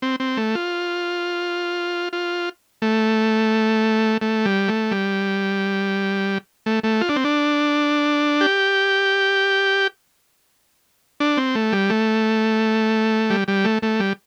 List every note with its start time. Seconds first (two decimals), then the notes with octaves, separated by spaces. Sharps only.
0.02 C4
0.20 C4
0.37 A3
0.55 F4
2.13 F4
2.82 A3
4.21 A3
4.45 G3
4.68 A3
4.91 G3
6.66 A3
6.84 A3
7.01 F4
7.09 D4
7.16 C4
7.24 D4
8.41 G4
11.20 D4
11.37 C4
11.55 A3
11.73 G3
11.90 A3
13.30 G3
13.48 G3
13.65 A3
13.82 A3
14.00 G3